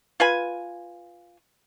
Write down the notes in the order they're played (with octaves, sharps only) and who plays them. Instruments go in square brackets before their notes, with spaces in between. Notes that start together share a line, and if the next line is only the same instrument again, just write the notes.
[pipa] F4 B4 G#5